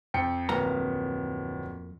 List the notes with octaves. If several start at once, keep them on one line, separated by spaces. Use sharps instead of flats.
F2 G5 C#7
D1 F2 A#3 B3 A#5